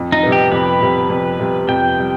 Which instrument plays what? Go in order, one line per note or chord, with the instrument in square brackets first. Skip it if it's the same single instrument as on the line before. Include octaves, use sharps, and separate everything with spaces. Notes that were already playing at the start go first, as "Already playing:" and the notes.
Already playing: [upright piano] F2
[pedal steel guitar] D#4
[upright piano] C3 G3 B3
[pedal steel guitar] G4
[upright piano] F2 [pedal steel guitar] B4
[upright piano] C3 G3 B3
F2
C3 G3 B3
[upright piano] F2 [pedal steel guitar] G5
[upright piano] C3 G3